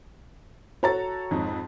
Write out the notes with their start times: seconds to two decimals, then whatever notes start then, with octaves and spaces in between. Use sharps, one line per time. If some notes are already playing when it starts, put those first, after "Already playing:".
0.83 F#4 A4 C#5 A#5 A6
1.31 F2 G#2 D#4